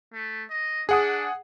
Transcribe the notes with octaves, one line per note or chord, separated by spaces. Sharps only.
A3
D#5
D4 G#4 F#5 D#6